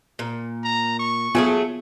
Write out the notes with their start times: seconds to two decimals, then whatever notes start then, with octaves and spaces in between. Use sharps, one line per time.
0.19 A#2
0.64 A#5
0.99 C#6
1.35 F#3 A3 B3 F4 G#4 G#5